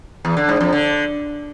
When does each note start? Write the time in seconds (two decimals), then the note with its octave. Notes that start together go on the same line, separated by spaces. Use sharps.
0.25 E2
0.37 D3
0.49 G#2
0.61 F2
0.72 D3